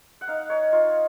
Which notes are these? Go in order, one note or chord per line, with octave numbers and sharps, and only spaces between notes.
F#5
D#4 F5
D#4 C#5
D#4 F4